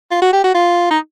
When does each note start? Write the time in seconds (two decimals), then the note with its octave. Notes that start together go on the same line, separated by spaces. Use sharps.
0.11 F4
0.22 F#4
0.33 G4
0.44 F#4
0.55 F4
0.91 D#4